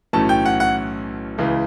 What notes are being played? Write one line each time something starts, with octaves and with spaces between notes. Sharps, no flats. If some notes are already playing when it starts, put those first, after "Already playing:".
B1 A2 E3 A3 C#4 A5
G5
F#5
F#5
C#2 C#3 E3